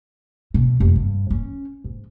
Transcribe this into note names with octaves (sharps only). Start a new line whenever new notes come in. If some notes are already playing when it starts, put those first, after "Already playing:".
B2
F1
G2
C#4
G#2